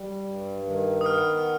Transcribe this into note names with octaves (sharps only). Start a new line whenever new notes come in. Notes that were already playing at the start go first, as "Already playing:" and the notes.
Already playing: G3
G2
D#3
D#6
B3 F6